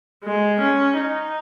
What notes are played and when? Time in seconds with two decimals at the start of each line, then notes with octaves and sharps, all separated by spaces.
0.24 G#3
0.60 C#4
0.96 D#4